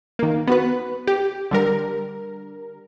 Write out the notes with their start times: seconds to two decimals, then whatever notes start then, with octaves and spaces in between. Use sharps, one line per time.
0.19 D#3 A#3
0.47 B3 F#4 B4
1.07 G4
1.51 D3 G3 A#4